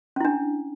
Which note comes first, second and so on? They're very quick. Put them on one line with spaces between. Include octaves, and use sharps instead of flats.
C#4 E4 D4